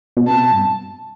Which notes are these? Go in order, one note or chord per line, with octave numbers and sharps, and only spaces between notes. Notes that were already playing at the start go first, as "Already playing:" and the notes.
B2
C3 A5
B2
G2